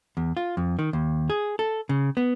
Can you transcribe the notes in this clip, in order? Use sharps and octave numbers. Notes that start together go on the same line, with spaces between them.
E2
F4
F2
D#3
D#2
G#4
A4
C#3
B3